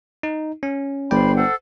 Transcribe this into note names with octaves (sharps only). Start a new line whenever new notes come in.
D#4
C#4
G1 C5 D5 G5 B5 C6
A4 C5 F#5